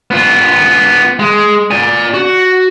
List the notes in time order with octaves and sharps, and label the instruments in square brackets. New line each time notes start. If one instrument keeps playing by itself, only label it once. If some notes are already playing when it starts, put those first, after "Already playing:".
[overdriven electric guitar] B3 F4
G#3
D5 G#5
F#4